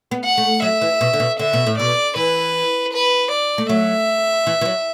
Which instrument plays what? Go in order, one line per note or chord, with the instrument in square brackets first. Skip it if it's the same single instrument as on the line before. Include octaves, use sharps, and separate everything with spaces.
[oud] B3
[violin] F#5
[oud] A3
[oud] F#3 [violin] E5
[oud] E3
B2
D3
B2
[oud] D3 [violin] E5
[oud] B2
A2
[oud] B2 [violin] D5
[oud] E3 [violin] B4
[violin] B4
D5
[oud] A3
[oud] F#3 [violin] E5
[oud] E3
E3
F#3